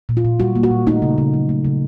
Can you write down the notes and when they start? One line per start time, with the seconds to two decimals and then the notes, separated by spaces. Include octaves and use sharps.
0.09 A#2
0.17 F4
0.25 A#2
0.40 G3 F#4
0.56 A#3
0.63 F#4
0.71 A#2
0.87 A3 D#4
1.02 C#3
1.18 C#3
1.34 F#3
1.49 A3
1.65 C#3